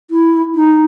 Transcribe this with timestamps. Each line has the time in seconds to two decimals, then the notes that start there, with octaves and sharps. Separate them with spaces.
0.11 E4
0.55 D#4